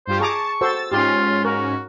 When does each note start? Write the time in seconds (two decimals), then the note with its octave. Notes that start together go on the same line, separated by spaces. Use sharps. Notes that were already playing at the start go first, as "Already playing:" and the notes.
0.07 G2 F4 G4 C5
0.20 G#4 A5 A#5 C#6 D6
0.61 F#4 A4 C5 E6 A6
0.92 G#2 C#4 F4 G4 C6
1.45 F#4 A#4